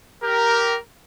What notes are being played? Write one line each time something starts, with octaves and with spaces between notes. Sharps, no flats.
G4 A#4